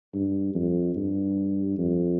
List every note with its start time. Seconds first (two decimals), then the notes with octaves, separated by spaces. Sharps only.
0.14 G2
0.55 F2
0.96 G2
1.78 F2